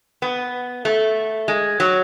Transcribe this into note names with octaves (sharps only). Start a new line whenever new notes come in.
B3
A3
G#3
F#3